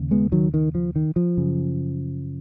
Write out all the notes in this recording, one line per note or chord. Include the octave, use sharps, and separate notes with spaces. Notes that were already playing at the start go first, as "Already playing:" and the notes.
Already playing: D#2 C#3
G#3 B3
D#3 F#3
D#3
F3
D#3
F3
F#2 C#3